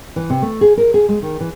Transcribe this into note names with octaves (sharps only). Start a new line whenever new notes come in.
E3
C3
A3
G#4
A#4
G#4
G#3
D#3
E3